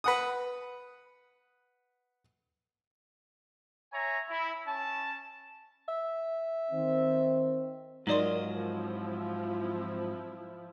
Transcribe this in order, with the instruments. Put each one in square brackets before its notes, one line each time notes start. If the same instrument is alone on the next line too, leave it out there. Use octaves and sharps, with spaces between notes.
[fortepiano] B4 F#5 D#6
[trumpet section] C#5 E5 G#5 A#5
E4
C#4 A5
[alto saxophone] E5
[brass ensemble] D#3 C4
[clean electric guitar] G#2 F#3 D#5 [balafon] D#4 D5 C6 [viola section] F4 A#4
[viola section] F3 C4 E4